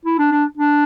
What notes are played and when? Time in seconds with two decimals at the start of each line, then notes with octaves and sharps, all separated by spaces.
0.05 E4
0.18 D4
0.32 D4
0.57 D4